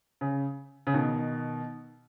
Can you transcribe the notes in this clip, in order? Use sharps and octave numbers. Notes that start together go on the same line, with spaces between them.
C#3
C#3
B2 D#3